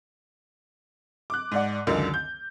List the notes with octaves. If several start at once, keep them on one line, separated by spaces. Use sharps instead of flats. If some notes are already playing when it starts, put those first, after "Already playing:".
D6 F#6
G#2 D5 F#5
C#2 F#2 D3 D#3
G6